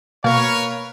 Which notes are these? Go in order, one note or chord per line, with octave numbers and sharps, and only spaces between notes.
B2 A#3 A#4 B4 C#5 F5